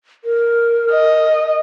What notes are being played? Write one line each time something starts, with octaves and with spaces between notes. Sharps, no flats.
A#4
D#5